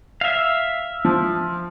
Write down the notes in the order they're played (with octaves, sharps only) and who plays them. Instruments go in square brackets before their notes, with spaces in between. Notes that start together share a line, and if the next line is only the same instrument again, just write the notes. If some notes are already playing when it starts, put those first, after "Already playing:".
[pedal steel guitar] E5 F5
[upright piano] F3